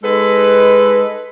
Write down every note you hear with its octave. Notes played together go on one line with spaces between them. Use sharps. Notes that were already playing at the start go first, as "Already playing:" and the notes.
G#3 D#4 A4 B4